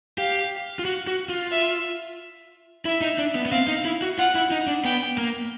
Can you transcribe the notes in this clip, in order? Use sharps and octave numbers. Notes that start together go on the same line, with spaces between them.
G4 F5
F4
F#4
F#4
F4
E5
E4 E5
D#4
D4
B3
B3
C4 F5
D#4
E4
F#4
F4 F#5
E4
D#4
D4
B3 G5
A#3